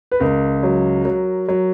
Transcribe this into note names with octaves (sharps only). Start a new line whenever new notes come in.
B4
C#2 A#4
F#3
F#3
F#3